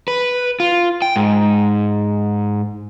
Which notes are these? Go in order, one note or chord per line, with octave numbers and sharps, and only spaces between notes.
B4
F4
G5
G#2